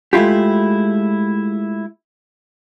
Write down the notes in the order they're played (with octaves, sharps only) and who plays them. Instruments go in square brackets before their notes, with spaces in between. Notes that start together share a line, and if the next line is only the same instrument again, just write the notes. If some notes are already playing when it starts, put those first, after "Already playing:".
[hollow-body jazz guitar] G#3 A3 E4 F4 G4